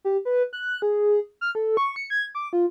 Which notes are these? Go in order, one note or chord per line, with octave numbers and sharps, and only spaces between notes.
G4
B4
F#6
G#4
F6
A4
C#6
C#7
G#6
D6
F4